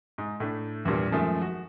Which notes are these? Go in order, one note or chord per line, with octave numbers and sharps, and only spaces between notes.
G#2
A2 A3 D4
E2 G2 A#2 G3
F#2 D#3 F3 G#3 A3
F#4